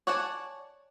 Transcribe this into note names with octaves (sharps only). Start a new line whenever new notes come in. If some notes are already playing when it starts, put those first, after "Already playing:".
C#5 D5 F#5 G#5 A5